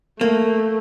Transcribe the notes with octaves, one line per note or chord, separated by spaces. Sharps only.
A3 A#3